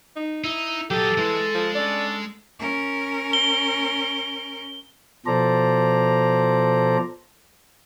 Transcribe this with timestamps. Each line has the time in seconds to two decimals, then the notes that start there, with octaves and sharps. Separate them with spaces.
0.16 D#4
0.44 D#4 E4
0.91 F#3 G4 A4 D#5
1.18 E3 G#3
1.55 F3
1.75 C#4 D4 A4 D5
2.59 C#4 A#4
3.33 G7
5.26 B2 F3 A4 C5 D5 A#5